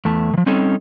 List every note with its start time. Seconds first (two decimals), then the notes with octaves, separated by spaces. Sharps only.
0.05 E2 A3 A5
0.33 D#3 F3
0.46 G3 C4 C#4 D#4 A4